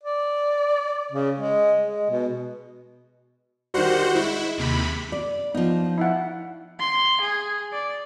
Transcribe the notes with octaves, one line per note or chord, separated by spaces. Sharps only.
D5
C#3
G#3
G#3
B2
D#3 G3 F#4 C5 F#5
G#3 E4
D#2 C3 B5
D5
F3 B3 D#4
E4 E5 F#5
C6
G#4
D5